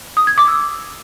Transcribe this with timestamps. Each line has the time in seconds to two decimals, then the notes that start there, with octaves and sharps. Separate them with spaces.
0.17 D#6
0.27 G#6
0.38 D6
0.48 E6